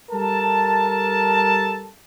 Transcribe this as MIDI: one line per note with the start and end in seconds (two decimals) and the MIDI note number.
0.12 1.88 55
0.12 1.88 69
0.12 1.88 70
0.12 1.88 81